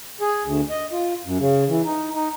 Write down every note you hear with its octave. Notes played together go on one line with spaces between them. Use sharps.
G#4
D2
D#5
F4
F#2
C#3
E3
D#4
D#4